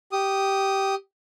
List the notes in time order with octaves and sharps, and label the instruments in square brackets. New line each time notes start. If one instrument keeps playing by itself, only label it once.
[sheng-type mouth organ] G4 D#6